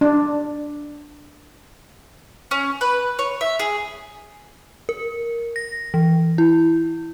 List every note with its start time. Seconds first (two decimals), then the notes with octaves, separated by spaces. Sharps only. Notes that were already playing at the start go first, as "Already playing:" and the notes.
0.01 D4
2.51 C#4
2.81 B4
3.19 C#5
3.41 E5
3.59 G#4
4.89 A#4
5.56 A#6
5.94 E3
6.38 E4